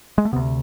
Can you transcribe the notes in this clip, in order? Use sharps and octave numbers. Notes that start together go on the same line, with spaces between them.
G#3
A3
D2 C3 B3